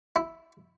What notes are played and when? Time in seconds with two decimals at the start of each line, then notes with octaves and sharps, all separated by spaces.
0.16 E4